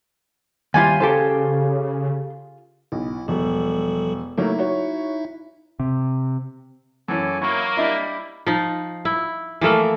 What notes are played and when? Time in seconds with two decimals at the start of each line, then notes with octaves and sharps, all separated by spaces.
0.74 D#2 G3 E4 F4 G#5
1.00 C#3 G4 A4 C5
2.92 B1 E4
3.28 E1 F3 G3 A4
4.37 F#3 A3 A#3 D#4 E4 E5
4.59 F#4 C#5
5.80 C3
7.08 F#2 E3 C#4 A4 G#5 D6
7.41 F#3 A#3 E4 C#5 C#6
7.77 G3 D4 E4 D#5 E5 B5
8.46 F3 D#4
9.05 E4
9.61 E3 F3 A3 A#3